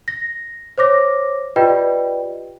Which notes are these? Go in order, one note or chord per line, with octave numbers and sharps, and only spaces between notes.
A#6
C5 C#5 D6 A#6
F4 G4 B4 D5 D#5 G5